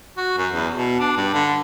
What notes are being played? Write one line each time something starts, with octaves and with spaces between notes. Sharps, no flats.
F#4
F#2
E2
B2
D4
G2
D3